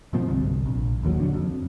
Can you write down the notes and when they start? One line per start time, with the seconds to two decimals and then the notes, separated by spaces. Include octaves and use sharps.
0.13 G#2 B2 F3 C4
0.27 G1 C2
0.66 A#1
1.03 D#1 D#2 C#3 F#3
1.20 D3 F#3
1.33 F2